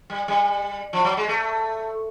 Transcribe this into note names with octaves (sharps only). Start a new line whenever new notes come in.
G3
G3
F3
F#3
G#3
A3